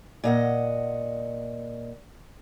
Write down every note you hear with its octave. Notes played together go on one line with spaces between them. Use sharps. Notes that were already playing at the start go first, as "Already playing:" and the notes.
A#2 D#5 F#5